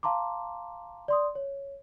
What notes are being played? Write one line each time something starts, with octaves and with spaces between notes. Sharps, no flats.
F5 A5 A#5 C6 D6
D5 C6 D#6
C#5